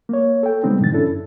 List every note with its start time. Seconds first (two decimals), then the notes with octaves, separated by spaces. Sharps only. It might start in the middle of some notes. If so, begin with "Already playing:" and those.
0.09 A#3 C#5
0.43 A4 G5
0.63 C#3 G3 G#3 B3 C4 D#4
0.79 G#2 B2 D3 E3 A6
0.92 C#4 D4 E4 A4
1.06 F#2